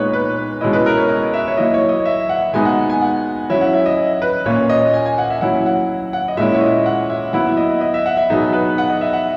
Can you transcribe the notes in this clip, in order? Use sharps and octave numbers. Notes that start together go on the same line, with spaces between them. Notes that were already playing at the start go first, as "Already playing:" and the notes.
Already playing: A#2 G#3 B3 D#4 B4 C#5
B4
B2 G#3 C#4 E4 D#5
B4
A#4
C#5
D#5
E5
C#5
F#3 A#3 E4 D#5
C#5
D#5
E5
F#5
B2 G#3 B3 D#4 G#5
F#5
G#5
F#5
F#3 C#4 E4 E5
F#5
E5
D#5
B4
A#2 A#3 C#4 C#5
D#5
G#5
G#5
F#5
E5
F#3 C#4 E4 F#5
F#5
F#5
D#5
A#2 G#3 C#4 E4 E5
C#5
D#5
F#5
E5
F#3 B3 E4 F#5
E5
D#5
D#5
E5
F#5
E5
B2 F#3 B3 D#4 G#4
B4
F#5
D#5
E5
F#5